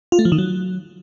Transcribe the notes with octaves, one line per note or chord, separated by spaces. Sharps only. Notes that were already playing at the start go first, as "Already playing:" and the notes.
F4
A3
F3
D#3
F#3